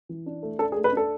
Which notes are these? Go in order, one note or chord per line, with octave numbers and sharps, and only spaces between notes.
E3
D4
A3
D4 A4
G#4
A3
B4
D4 A4